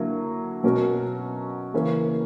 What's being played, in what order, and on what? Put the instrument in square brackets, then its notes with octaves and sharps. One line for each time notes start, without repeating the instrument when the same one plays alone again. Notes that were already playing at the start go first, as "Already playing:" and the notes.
Already playing: [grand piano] D3 F#3 A#3 E4
B2 F#3 C#4 F#4 A#4
C#3 E3 A#3 C#4